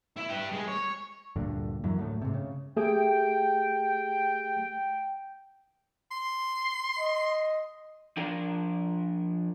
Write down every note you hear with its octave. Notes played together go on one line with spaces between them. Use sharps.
E4
G4 B4
G#3
C#5
D2 G2 A#2 D3
F#2 E3 F#3
D2 A2 A3
G#2 C3
C#3
A3 G4 G#4 G5
C6
D#5
F3 D4 A#4